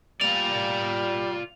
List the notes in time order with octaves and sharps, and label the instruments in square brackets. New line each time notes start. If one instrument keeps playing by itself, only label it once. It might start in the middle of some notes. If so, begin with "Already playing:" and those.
[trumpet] G3 [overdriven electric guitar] F4 D5 [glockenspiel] F7